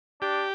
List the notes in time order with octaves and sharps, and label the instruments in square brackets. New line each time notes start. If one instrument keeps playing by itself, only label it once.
[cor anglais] D4 [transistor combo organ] G4